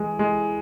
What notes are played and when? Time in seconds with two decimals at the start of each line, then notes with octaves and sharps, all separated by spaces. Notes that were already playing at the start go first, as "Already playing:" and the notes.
Already playing: E3 G#3
0.19 G#3